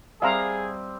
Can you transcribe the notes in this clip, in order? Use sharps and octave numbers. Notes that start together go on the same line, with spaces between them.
G3 C4 G#4 E5 F5 A#5